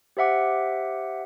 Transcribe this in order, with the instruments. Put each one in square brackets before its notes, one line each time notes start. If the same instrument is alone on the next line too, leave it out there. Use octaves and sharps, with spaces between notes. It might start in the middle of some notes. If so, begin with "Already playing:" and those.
[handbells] G4 C5 E5 F#5 D6